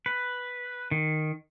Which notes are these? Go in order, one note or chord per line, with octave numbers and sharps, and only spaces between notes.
B4
D#3